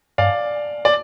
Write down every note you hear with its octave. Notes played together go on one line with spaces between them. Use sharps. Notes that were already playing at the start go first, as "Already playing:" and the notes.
G2 D5 F5
D5